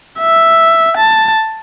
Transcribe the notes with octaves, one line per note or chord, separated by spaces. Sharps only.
E5
A5